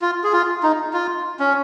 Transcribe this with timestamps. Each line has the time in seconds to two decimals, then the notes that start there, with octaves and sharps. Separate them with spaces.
0.02 F4
0.24 G#4
0.33 F4
0.63 D#4
0.93 F4
1.39 C#4